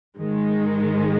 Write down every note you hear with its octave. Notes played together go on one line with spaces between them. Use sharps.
G#2 D#3 G#3